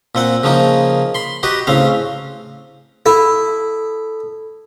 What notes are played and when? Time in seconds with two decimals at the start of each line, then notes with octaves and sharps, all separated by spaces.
0.15 A#2 C4 F#5
0.43 C#3 F3 A#3 D#4
1.15 B5 C6
1.43 F#4 G4 B4 D#5
1.67 A1 C#3 C4 F5
3.06 E4 A4